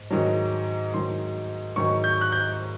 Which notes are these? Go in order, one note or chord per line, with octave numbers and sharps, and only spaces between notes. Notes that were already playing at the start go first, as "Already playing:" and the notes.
Already playing: G#2
G#2 D#3 F#3
G#2 D#3 F#3 C6
G#2 D#3 F#3 C#6
G6
F#6
G6